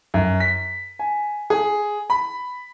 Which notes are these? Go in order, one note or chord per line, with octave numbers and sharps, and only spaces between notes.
F#2
B6
G#5
G#4
B5